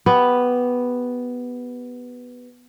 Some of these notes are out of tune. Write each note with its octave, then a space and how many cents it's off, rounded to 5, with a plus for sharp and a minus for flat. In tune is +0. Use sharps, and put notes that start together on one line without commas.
B3 +0 G4 +0